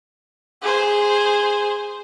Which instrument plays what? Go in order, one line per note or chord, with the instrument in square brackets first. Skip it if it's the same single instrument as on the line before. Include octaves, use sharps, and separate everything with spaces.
[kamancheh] G#4 C5